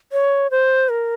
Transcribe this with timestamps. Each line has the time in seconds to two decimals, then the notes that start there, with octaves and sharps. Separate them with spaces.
0.12 C#5
0.51 C5
0.89 A#4